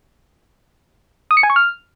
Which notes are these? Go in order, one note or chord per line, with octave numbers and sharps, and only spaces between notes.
D#6
C#7
G#5
C#6
F6